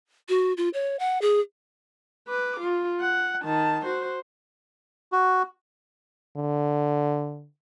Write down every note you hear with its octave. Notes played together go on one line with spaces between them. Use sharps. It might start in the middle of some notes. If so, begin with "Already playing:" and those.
F#4
F4
C#5
F#5
G#4
B4 D6
F4
F#5
D#3 A5
F#4 C5
F#4
D3